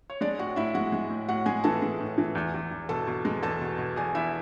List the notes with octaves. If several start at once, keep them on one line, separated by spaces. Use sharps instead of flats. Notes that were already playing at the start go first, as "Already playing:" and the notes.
C#5
G#3 D4 D5
A2 F#4 F#5
A2 E4 E5
G#3 F#4 F#5
G#3
A2
A2 F#4 F#5
G#3 G#4 G#5
E3 A4 A5
G#3
A2
E3
E2
E2
E2
B2 A4 A5
B2
G#3
E2 A4 A5
B2
B2
E2 G#4 G#5
E2 E4 E5